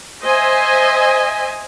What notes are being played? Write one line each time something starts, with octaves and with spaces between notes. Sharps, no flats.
C5 D#5 E5 G#5